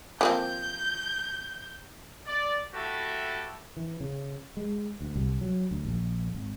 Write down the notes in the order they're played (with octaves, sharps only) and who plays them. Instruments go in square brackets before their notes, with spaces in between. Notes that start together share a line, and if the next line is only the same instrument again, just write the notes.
[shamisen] F3 A#3 C4 [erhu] G6
[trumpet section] D5
A3 E4 F#4 G4 A4
[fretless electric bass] E3
C#3
G#3
D2
C2
F#3
D2
A#1
G#1